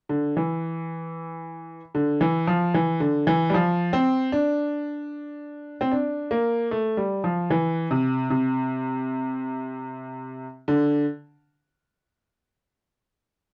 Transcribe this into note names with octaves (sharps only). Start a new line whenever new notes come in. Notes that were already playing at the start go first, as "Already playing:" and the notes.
D3
E3
D3
E3
F3
E3
D3
E3
G3
F3
C4
D4
C4
D4
A#3
A3
G3
F3
E3
C3
C3
D3